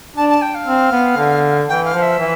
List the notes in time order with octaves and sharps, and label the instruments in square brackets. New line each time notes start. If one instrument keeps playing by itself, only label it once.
[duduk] D4 [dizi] A5
[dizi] A5
G5
F5
[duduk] C4
B3
D3
[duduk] E3 [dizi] G5
[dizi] F5
[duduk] F3
[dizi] E5
[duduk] E3